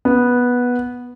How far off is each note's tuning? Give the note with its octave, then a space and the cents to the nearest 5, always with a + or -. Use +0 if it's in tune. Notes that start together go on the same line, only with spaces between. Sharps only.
B3 -10